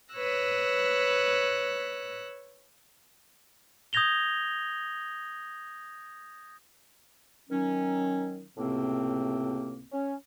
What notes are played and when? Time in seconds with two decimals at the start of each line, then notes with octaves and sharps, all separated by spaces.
0.14 B4 C#5 E6 F#6 A#6
3.93 D#6 G6 G#6 A#6 F7 G7
7.49 D#3 F#3 C#4
8.57 C#2 A2 C3 A#3 C4
9.92 C#4